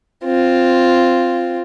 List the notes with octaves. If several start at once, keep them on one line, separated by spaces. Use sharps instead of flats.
C4 F4